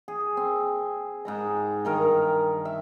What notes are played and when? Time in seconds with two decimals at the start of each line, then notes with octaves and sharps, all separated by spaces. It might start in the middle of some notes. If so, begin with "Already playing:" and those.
0.08 G#4
0.37 C4
1.25 G#2 G#3 A#5
1.85 G2 D#3 A#4
2.65 E5